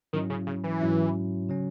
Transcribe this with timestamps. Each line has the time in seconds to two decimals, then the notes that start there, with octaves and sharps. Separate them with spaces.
0.13 G#2 D#3 F#3 C#4 E4
0.30 C#3
0.47 C#3
0.64 E3
0.81 G#2 F#3 C#4 E4
1.49 C#3 F#3 C#4